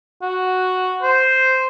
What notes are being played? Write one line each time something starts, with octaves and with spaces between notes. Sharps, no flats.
F#4
C5